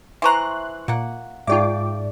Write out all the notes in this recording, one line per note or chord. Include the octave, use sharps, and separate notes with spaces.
E3 C5 E5 A#5 C6 C#6 F#6
A#2 A#3 F#5
G#2 D#4 F4 G#4 D5 E5 G5 D6